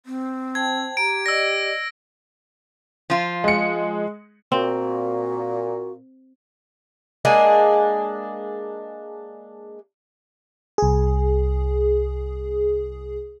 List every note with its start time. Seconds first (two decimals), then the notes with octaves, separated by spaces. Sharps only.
0.06 C4
0.55 C5 G5 A5 G#6
0.97 G4 A#5 D7
1.26 D5 D#5 E6 A#6
3.10 F3 F4
3.44 G#3 C#7
4.52 A#2 C4 F#4
7.25 G#3 A#3 D4 G#4
10.78 C2 G#4